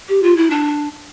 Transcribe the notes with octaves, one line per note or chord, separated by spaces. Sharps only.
G4
F4
E4
D4